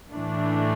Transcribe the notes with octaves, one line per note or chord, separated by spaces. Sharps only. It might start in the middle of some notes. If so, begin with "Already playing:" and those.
A2 E3 A3 D4